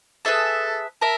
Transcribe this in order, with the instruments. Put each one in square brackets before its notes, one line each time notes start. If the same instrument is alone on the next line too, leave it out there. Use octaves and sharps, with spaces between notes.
[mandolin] G#4 B4 E5 A5 [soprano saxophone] A4
[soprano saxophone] A#4 [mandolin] E5 A5